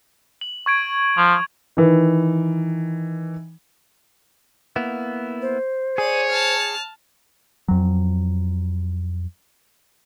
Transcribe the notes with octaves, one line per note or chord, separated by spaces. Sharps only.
F#7
C#6 G#6 D7
F3 F7
D#3 E3
A#3 B3 E4
C5
G#4 C#5 D5 D#7
A5 F6
F2 F#3